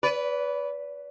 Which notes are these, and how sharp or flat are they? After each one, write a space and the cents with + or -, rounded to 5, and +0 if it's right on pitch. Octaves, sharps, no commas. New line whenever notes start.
B4 +0 D5 -35